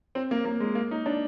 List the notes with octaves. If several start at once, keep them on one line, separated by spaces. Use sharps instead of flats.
C4
A#3
A#3
G#3
A#3
D#4
D4